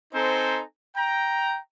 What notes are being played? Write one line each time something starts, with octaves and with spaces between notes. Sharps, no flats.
C4 D#4 A4 C5 G#5 A#5
G5 A#5